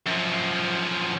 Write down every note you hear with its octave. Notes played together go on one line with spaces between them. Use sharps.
F#2 F3